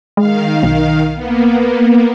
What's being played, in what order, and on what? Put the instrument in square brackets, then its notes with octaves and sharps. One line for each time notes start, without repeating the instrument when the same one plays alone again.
[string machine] D#3 F5 [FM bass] G#3
[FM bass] B1
[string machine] A#3 B3